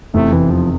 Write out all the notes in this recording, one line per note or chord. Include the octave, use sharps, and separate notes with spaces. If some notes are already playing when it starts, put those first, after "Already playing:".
F1 E2 C3 A3
E3
F3